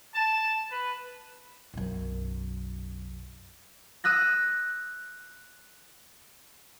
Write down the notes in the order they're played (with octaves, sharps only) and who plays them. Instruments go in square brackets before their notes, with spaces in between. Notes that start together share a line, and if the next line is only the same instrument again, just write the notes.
[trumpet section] A5
B4
[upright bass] B1 F#2
[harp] D#6 E6 F#6 A#6